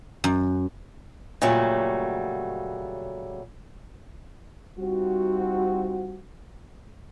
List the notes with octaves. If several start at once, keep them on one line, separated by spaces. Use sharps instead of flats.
F#2
A#2 C#3 F#3 G3 A3
G3 C4 D#4 F4 F#4